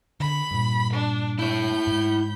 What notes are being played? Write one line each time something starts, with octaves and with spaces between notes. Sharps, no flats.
D3 B5
G2 A#2
D4
E4 C#5 B5 G6
G#2